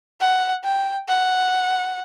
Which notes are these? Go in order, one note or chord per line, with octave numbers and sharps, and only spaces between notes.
F#5
G5
F#5